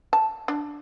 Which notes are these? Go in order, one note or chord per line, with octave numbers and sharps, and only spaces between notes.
A5
D4